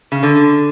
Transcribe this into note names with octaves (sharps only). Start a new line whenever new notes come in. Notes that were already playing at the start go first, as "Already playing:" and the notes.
C#3
D3